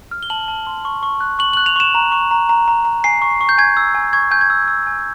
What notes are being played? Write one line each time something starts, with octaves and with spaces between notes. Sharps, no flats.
F6
G7
A5 F#7
A5
C6
C#6
C#6
F#6
C#6 F#7
F#7
F#6
F7
C#6 E7
A#5
C#6
A#5
A#5
A#5
A#5
G#5 C7
C#6
C#6
G6
G#5 G#6
E6
G#5
C#6 G#6
G#5 G6
G#6
E6
E6
G#5